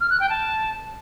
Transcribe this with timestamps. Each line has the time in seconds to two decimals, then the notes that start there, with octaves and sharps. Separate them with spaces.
0.01 F6
0.10 F#6
0.20 G5
0.29 A5